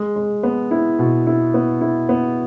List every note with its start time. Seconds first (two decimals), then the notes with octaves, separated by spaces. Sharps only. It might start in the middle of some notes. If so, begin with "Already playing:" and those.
Already playing: G#3
0.16 G#3
0.43 B3
0.71 E4
0.99 B2
1.27 E4
1.54 B3
1.81 E4
2.09 B3